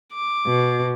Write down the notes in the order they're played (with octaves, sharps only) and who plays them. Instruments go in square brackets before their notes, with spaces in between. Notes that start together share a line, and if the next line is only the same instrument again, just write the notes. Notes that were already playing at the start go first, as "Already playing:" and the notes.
[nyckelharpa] D6
[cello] B2